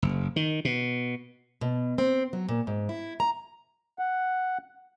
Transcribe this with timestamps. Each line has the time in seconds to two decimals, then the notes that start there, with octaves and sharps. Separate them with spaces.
0.02 F#1
0.36 D#3
0.65 B2
1.61 B2
1.98 C4
2.33 F#3
2.49 A#2
2.67 G#2
2.89 E4
3.20 A#5
3.99 F#5